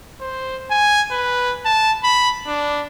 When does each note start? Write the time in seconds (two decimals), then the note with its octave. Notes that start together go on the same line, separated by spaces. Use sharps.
0.21 C5
0.71 G#5
1.11 B4
1.65 A5
2.04 B5
2.47 D4